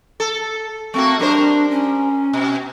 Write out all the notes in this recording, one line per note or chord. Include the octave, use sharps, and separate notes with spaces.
A4
A3 A#3 C4 F#4
G3 D4 A#4 C5
C#4
B2